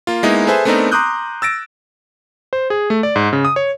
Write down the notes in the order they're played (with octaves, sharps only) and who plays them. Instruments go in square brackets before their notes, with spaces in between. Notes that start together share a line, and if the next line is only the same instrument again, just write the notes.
[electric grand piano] A#3 F4
G#3 A#3 B3 D#4 E4
G#4 A4 B4 C5 E5 G#5
A3 B3 C4 D4 D#4 A#4
A#5 C6 D6 D#6 F#6 G6
E6 A6 A#6 D7
C5
G#4
A3
D5
G#2
C#3
D#6
C#5